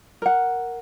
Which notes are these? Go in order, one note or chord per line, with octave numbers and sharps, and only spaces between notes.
A#4 F#5